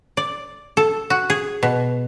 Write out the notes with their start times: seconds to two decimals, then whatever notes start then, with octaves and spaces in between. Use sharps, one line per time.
0.17 D5
0.77 A4
1.10 F#4
1.30 G#4
1.63 B2